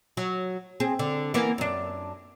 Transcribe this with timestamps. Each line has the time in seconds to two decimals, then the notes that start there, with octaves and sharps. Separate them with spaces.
0.17 F#3
0.80 C4 G#4
0.99 D3
1.34 E3 A#3 B3
1.58 F#2 D4